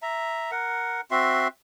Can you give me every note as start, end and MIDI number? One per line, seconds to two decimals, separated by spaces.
0.02 0.51 76
0.02 0.51 82
0.51 1.01 70
0.51 1.01 78
1.11 1.48 60
1.11 1.48 66
1.11 1.48 76
1.11 1.48 84